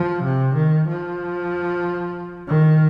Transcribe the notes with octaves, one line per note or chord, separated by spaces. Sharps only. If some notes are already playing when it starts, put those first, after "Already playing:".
Already playing: F3
C3
D#3
F3
D#3